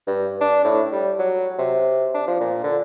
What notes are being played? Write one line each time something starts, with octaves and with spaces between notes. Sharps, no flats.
G2
D4
A2
G3
F#3
C3
D4
F3
A#2
D3